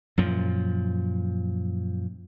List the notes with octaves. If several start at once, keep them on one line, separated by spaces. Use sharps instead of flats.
F#2 A#2 F3